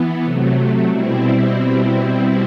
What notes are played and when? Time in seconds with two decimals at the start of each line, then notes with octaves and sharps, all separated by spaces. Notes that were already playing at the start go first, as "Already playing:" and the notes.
Already playing: E3 B3
0.24 C3 F#3 A3
0.89 B2 G3 C4 E4